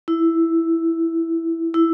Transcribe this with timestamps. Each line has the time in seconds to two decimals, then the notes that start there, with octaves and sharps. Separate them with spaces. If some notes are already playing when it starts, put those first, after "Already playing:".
0.08 E4
1.74 E4